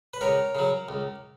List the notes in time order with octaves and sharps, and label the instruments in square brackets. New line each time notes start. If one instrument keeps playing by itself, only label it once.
[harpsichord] B4
C#2 A#4 C#5
C#3 F#3
C#2